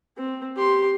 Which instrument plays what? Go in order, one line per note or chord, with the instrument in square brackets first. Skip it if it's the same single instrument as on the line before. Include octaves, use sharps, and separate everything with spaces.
[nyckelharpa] C4
G4 C6